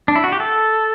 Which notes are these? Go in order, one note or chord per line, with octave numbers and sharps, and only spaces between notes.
D4
E4
F#4
G4
A4